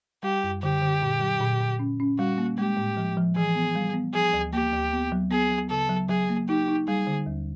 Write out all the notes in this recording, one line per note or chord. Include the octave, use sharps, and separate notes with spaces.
G3 G4
F#2
D3 G4
D3
A#2
F#3
A#2
A#2
C#4
C#4
G3 F#4
A#3
G#3 G4
A2
F3
F3
E3 G#4
B3
G3
B3
F3 G#4
D2
A#3 G4
D2
B3
F#3
B3 G#4
F#3
C#3 A4
F#3
F#3 G#4
A#3
D#4 G4
D#4
G3 G#4
D3
D#2